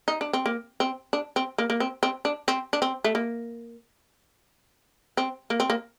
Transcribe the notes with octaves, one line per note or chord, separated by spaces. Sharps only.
D#4
D4
C4
A#3
C4
D4
C4
A#3
A#3
C4
C4
D4
C4
D4
C4
A3
A#3
C4
A#3
C4
A#3